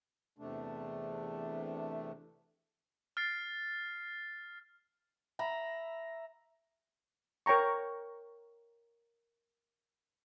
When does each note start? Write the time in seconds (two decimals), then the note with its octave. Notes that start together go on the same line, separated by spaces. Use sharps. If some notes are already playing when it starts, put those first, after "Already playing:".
0.38 E2 C3 A3 D4
3.17 F6 A6 C7
5.39 E5 A#5 B5
7.46 A#4 C#5 G5 A#5 C#6